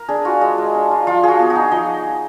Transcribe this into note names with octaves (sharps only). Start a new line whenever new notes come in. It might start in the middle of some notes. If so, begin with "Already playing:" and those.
Already playing: A#4
D4 G#4
F4 F#4
G#3
G#3
D4
F4
F3 F4
F3 F#4 G#4
B3
F#4
D#4
F3 D#5